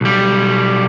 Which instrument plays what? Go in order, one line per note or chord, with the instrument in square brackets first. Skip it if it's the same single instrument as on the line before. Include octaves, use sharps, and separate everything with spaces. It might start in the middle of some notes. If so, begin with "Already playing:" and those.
[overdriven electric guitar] B1 G3